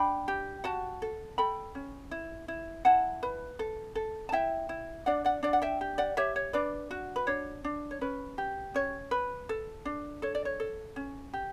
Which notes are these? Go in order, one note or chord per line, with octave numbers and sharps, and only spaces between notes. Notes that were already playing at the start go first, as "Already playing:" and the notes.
Already playing: D4 G5 B5
G4
F#4 F#5 A5
A4
A4 G5 B5
C#4
E4
E4
E4 F#5 A5
B4
A4
A4
A5
E4 E5 G5
E4
D4 D5 F#5
D5 F#5
D4 D5 F#5
F#5
E5 G5
G4
D5 F#5
G4 C#5 E5
C#5
D4 B4 D5
F#4
B4
D4 C#5
D4
C#5
C#4 B4
G4
C#4 C#5
B4
A4
D4
A4 C#5
D5
C#5
A4
C#4
G4